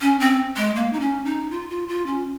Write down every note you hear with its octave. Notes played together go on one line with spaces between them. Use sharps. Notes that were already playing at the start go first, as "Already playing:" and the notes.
C#4
C4
G#3
A#3
D#4
C#4
D#4
F4
F4
F4
C#4